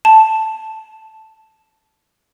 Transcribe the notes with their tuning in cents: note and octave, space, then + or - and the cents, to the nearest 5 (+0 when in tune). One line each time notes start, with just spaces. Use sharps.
A5 +0